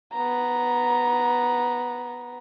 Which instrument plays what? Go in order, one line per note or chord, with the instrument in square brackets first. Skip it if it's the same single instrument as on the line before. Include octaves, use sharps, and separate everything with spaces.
[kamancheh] B3 A#5